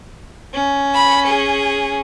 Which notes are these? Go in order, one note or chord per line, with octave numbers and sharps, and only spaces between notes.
C#4
B5
G#4